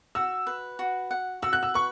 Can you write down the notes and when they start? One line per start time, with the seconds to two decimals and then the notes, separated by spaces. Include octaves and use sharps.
0.15 F#4 E6
0.47 B4
0.79 F#4
1.11 F#5
1.42 F#4 E6
1.53 F#6
1.63 E6
1.74 B4 C#6